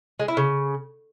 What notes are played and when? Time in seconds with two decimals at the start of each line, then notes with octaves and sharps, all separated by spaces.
0.20 G#3
0.28 E4
0.37 C#3